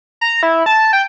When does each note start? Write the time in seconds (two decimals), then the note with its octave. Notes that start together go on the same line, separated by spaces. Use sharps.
0.21 A#5
0.43 E4
0.66 A5
0.93 G5